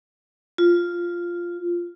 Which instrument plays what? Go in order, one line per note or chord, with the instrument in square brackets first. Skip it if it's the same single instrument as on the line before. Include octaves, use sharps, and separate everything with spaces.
[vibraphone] F4